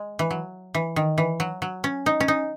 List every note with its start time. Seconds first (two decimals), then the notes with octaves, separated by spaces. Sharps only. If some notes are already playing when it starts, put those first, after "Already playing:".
Already playing: G#3
0.19 E3
0.31 F#3
0.74 E3
0.96 D#3
1.18 E3
1.40 F#3
1.62 F#3
1.84 C#4
2.06 D#4
2.20 C#4
2.28 D#4